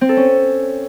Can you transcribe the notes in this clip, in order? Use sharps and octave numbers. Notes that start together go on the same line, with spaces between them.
C4
A4
C#4